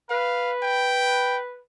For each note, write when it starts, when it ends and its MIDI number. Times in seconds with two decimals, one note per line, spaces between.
0.10 1.60 71
0.10 0.52 77
0.63 1.38 79